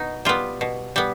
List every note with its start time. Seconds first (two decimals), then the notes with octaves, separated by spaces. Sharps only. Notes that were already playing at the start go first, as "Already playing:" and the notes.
Already playing: B2 D#4
0.25 G3 B3 F4
0.61 B2
0.96 G3 B3